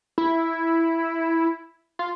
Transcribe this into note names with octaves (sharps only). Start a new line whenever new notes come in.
E4
F4